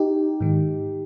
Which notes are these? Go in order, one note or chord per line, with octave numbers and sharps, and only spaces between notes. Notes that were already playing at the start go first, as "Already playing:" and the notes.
Already playing: D#4 G4
G#2 D#3